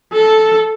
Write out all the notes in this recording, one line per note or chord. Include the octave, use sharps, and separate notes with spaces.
A4